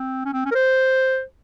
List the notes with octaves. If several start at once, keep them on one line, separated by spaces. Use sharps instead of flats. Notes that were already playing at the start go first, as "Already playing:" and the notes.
Already playing: C4
C#4
C4
C#4
A#4
C5